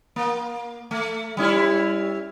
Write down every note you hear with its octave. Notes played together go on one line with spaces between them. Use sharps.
A#3
A3
G3 C#4 E4